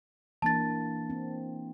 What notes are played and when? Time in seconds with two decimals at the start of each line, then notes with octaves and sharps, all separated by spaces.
0.42 E3 A#3 D4 A5 A6
1.10 C4